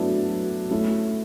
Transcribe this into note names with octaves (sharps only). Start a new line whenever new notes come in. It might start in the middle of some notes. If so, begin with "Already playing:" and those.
Already playing: F#3 A3 B3 D4 E4
F#3
A3 C#4 E4